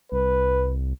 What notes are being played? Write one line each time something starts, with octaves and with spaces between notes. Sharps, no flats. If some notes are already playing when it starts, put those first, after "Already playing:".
C2 B4